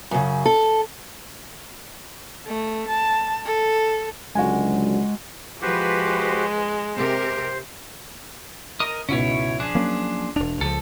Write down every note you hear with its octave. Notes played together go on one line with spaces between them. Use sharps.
F#2 C#3
A4
A3
A5
A4
C#2 D3 F#3 G#3 F#4 G#5
F3 G#3 F#4 G4 B4 C5
C3 G4 A#4 C5
A#4 D#5 D#6
C#2 G#2 B2 C#4 E4 C#5
F3 D4 G#4 F#6
F#3 A#3 C#4
E1 D4 F7
C#2 F3 A4